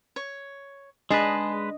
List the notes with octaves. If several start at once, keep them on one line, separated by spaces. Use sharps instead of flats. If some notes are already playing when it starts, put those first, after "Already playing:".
C#5
G#3 D4 G#4 B4 D#5 A5